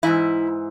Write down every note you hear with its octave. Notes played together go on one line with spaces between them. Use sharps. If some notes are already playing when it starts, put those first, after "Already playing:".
G#2 E3 E4